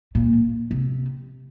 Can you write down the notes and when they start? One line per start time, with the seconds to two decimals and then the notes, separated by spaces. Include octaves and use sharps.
0.15 A#2
0.71 C3